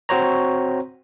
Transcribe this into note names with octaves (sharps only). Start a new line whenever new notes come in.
C4 F#4 C5 C#5 A#5